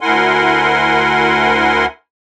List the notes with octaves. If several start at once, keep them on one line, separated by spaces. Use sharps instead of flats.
D2 E4 A#4 F#5 G#5 C6